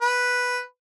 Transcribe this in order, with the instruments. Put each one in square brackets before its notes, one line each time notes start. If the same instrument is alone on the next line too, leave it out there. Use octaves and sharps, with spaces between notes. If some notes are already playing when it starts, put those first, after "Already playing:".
[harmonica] B4